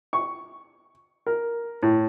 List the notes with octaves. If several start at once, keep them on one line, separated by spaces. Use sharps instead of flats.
C#6
A#4
A2